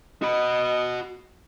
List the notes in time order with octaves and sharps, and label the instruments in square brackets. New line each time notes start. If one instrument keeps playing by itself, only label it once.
[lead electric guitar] F#4 B5 [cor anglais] D#5